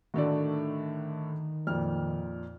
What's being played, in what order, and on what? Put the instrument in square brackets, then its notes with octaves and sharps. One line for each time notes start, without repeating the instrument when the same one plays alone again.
[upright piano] A2 D3 A3 [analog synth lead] D#3 [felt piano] F#4 A4 D5
[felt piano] F2 A#2 [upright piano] F6